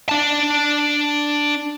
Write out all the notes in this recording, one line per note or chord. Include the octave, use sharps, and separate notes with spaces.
D4 A5